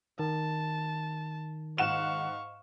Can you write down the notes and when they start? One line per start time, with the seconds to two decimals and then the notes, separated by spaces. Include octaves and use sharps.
0.19 D#3 A5
1.78 G#2 F5 F#5 C#6 E7